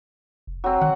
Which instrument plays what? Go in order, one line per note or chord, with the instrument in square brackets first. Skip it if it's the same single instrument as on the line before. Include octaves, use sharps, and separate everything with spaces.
[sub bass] F1
[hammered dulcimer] F#3 C4
[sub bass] D#3 [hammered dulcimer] F#5